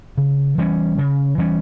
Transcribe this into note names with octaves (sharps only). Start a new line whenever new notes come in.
C#3
E3 G3 C#4
C#3
E3 G3 C#4